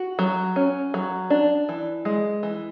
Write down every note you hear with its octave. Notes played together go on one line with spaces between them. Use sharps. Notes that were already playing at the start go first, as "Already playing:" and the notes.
Already playing: F#4
F#3
C#4
F#3
D4
E3
G#3
E3